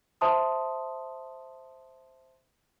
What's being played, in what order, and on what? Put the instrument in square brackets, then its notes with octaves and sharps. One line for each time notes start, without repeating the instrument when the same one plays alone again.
[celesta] C5 E5 A5 C6 D#6